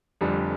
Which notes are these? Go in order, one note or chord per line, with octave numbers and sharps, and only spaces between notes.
F1 F2 D3 G3